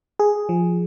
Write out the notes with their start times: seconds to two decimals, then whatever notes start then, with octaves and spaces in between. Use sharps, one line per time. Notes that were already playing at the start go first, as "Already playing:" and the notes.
0.19 G#4
0.49 F3